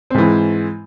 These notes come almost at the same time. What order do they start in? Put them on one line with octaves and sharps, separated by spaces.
C4 G#2 E3 G#3